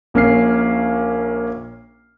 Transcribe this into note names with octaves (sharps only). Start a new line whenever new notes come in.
A#1 A#3 C#4 F6 C7